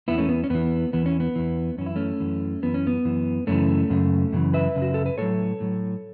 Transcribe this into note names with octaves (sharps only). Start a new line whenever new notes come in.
E2 E3 B3 E4
A3 C#4
B3
C#4
E2 E3 B3
E2 E3 B3
C#4
B3
E2 E3
F#2 E3 C#4
E4
A3 C#4
F#2 E3
F#2 E3 B3
C#4
B3
F#2 E3
F#2 C#3 E3 A3 C#4
F#2 C#3
F#2 C#3 E3
B4 E5
F#2 C#3
F#4
A4
B4
A2 F#3 A4 C#5
A2 F#3